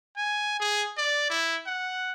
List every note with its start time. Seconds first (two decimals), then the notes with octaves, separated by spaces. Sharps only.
0.17 G#5
0.60 G#4
0.97 D5
1.30 E4
1.67 F#5